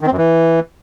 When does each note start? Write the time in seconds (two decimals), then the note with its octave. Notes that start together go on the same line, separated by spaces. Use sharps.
0.01 D#3
0.06 C4
0.12 F#2
0.17 E3